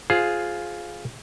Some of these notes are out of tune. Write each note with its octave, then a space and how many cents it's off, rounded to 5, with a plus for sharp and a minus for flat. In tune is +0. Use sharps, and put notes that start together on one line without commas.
F4 +5 G#4 +10 C5 +0